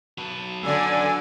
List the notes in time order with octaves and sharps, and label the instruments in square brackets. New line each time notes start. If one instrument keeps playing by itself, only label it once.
[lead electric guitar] F#3 B4 [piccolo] A5
[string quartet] D3 [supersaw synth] D5 G#5 [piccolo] E6